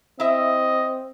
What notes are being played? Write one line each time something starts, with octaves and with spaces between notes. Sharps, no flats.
C4 E4 D#5 E5